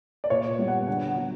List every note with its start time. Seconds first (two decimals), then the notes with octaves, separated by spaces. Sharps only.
0.24 D5
0.30 A#2 C#5
0.59 G3 B3
0.68 F#5
0.87 D3 F#5
1.07 F#5
1.16 F#3 B3